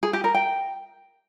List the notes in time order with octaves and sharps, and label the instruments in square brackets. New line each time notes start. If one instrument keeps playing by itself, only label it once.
[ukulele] G#4
G4
A#4
G5